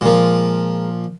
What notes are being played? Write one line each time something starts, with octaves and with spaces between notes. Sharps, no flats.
A#2 F3 G#3 A#4